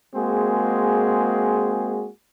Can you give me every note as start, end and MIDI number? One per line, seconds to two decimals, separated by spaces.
0.15 2.08 56
0.15 2.08 58
0.15 2.08 60
0.15 2.08 66
0.15 2.08 68